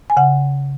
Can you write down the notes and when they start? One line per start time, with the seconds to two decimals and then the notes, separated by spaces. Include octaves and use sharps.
0.10 G#5
0.17 C#3 F#5